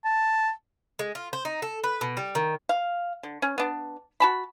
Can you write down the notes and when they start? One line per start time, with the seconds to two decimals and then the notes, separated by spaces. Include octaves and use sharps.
0.05 A5
0.99 G#3
1.15 F4
1.33 C5
1.45 D#4
1.62 A4
1.84 B4
2.01 B2
2.17 G3
2.35 D#3
2.69 F5
3.23 D3
3.42 C#4
3.58 B3 D4
4.20 F#4 A5 B5